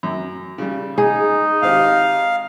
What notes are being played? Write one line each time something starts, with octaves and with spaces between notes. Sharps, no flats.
F#2
C#3 G3
D#4 G#4
G#1 C4 G4 F5